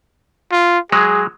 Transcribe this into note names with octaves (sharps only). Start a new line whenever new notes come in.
F4
F#3 G#3 G#4